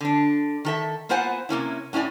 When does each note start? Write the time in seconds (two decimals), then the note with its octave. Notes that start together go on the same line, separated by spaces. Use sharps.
0.01 D3 D4
0.65 D#3 A4 E5
1.09 A#3 B3 F4 C5 F#5 G#5
1.49 C3 A#3 C#4 E4
1.93 A2 C#4 E4 D5 G#5